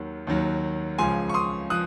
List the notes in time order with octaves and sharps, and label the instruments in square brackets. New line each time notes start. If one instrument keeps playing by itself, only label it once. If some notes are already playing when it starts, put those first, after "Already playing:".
Already playing: [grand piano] D#2 D#3 F#3
D#2 D#3 F#3
C#2 C#3 F3 G#5 C6
C#6
C6 D#6
F3 D#6 F#6